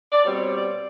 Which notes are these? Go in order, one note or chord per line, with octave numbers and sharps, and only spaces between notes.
D5
B2 G3 C4 C#5
C#5
D5